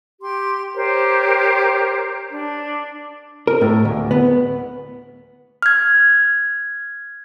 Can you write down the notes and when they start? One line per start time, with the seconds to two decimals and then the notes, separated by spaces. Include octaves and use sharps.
0.22 G4 C6
0.75 G4 A#4 C5 C#5
2.31 D4
3.47 A#4
3.61 A2
3.85 D2
4.11 B3
5.62 F6 G#6